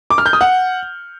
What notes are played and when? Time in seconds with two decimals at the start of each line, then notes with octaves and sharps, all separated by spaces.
0.10 D6
0.18 F6
0.26 G6
0.33 D#6
0.41 F#5